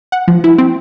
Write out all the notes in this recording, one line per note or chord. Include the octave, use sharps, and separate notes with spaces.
F#5
F3
E4
C4